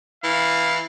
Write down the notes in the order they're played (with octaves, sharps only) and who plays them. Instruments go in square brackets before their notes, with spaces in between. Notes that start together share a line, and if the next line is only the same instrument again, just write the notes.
[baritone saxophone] E3 [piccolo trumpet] F5